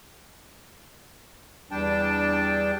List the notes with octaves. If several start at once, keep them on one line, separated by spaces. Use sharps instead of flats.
E2 G3 D4 G5 A5